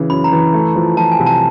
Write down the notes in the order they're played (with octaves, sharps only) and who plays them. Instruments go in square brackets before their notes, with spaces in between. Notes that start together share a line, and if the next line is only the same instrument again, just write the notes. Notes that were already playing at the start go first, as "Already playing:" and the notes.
Already playing: [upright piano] C#3 E3
[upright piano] F#2 [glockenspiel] B5
[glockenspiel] A#5
[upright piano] E3
A3
F3
[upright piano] F3 [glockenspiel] A5
[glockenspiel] G#5
[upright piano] C2
[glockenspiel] A5